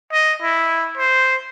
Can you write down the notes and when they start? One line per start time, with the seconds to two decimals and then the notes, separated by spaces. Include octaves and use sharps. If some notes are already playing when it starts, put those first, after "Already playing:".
0.12 D#5
0.42 E4
0.98 C5